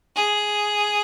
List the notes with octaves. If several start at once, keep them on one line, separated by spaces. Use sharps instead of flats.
G#4